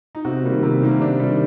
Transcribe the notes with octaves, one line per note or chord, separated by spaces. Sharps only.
D#4
C3 F#4
D#3 G3 A#3
C3
D#3 G3 A#3
C3 D4
D#3 G3